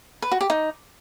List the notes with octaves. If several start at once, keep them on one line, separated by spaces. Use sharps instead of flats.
B4
F#4
G4
D#4